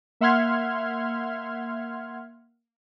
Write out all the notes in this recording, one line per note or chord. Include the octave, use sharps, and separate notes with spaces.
A#3 E5 F#5 C6 F6 G#6